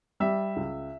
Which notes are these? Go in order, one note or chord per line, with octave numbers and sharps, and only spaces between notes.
G3 E5
C#2